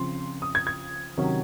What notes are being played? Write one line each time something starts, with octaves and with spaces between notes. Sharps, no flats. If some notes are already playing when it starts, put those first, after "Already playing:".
Already playing: C#3 F3 C4 C6
D#6
G#6
G#6
C3 D#3 F#3 C#4